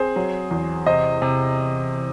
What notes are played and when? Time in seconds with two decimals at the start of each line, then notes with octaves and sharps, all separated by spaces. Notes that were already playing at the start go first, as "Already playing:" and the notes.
Already playing: C4 G#4 C5
0.16 F#3
0.51 E2
0.86 C3 C5 D#5
1.22 C3